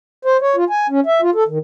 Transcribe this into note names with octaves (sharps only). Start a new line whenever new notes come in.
C5
C#5
F4
G#5
C#4
E5
F4
A4
D#3